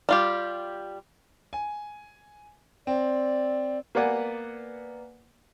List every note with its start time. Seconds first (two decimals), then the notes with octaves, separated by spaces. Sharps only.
0.09 G3 F4 G4
1.53 G#5
2.87 C4 D5
3.95 A#3 B3 B4 D5 F#5 G#5